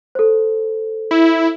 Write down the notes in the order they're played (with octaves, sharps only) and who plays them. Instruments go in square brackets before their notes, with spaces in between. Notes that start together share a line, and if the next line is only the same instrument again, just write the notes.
[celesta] A4 C5
[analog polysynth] E4